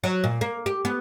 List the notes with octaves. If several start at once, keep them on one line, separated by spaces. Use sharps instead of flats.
F#3
A#2
A#3
G4
B3